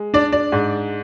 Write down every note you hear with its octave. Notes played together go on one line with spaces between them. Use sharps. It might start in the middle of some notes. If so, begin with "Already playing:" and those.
Already playing: G#3
D4 D5
D5
G#2